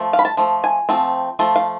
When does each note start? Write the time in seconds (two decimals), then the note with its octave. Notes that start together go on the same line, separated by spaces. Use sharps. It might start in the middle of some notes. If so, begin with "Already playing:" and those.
Already playing: F3 A3
0.13 F5
0.19 B5
0.25 A5
0.37 F3 A3
0.64 G#5
0.89 F3 A3 C4
1.39 F3 A3
1.56 F5